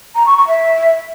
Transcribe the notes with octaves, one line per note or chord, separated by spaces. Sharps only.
A#5
C#6
C#6
E5